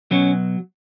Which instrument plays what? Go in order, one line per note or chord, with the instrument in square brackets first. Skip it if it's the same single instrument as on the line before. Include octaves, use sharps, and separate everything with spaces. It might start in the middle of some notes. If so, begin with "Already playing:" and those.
[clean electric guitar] B2 F#3 C#4